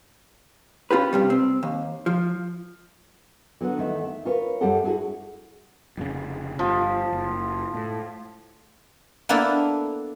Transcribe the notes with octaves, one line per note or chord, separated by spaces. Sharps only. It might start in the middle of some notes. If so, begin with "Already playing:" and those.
C#4 F4 G4 B4
G2 C3 G3
C4
D#2
F3
D3 F#3 B3
E2 D#3 A3 E5
E5
F4 A#4 B4 C#5
F#2 G3 G4 A4 F#5
E4 F#4 G#4 A4
F1 A#2 C#3
G1 F3
F#1
A2
A#3 B3 D4 E4 A4